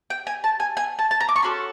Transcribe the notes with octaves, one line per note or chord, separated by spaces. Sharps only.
G5
G#5
A5
G#5
G#5
A5
A5
A#5
D6
C#6
C#4 F#4 A4 C6